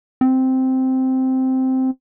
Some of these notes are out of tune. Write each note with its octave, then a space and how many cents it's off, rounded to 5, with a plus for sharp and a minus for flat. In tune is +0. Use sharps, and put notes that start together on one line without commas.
C4 -5